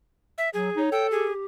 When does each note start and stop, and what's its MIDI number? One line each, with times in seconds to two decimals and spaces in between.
0.38 0.49 76
0.54 0.69 54
0.54 0.81 68
0.77 0.91 63
0.77 1.07 73
0.92 1.27 69
0.92 1.07 79
1.11 1.45 67
1.11 1.33 68